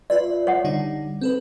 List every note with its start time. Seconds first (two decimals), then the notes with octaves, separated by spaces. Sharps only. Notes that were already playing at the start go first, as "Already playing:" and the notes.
0.10 F4 B4 D5 E5
0.47 C#5 F#5
0.64 D3 G3 D#4
1.21 C4 A4 B4